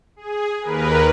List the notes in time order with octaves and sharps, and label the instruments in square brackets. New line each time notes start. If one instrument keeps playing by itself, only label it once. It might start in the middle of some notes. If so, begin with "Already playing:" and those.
[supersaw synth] G#4
D#2 A#4 B4